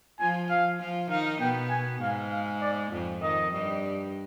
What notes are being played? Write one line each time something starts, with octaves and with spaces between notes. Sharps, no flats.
F3 F4 G#5
F5
F3 F4
D#3 D#4 F5
B2 B3 G5
G#5
G#2 G#3 F5
F5
D5
F2 F3
D#3 D#5
G2 G3